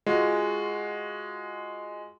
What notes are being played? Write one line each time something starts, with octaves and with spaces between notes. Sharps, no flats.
G#3 F4 F#4